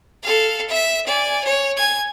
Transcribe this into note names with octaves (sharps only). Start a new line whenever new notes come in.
A4 F5
E5 B6
D5 G#5
C#5
G#5 G#6